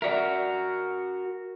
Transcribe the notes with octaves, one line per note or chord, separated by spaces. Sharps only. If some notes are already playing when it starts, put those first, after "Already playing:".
F#4 A#4 D5 E5